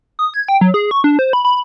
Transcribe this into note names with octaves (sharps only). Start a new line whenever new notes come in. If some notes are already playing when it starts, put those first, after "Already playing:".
D#6
G#6
G5
F#3
G#4
C#6
D4
C5
B5
B5